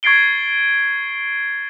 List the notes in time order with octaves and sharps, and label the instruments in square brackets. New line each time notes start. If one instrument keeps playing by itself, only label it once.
[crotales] C#6 G#6 A6 C7 D7 G7